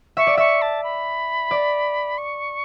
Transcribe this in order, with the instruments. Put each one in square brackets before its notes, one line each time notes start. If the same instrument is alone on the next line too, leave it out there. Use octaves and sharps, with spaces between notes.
[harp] E5 [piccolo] C#6
[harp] D5
[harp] E5 [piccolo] C#6
[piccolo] A5
B5
[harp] D5
[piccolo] C#6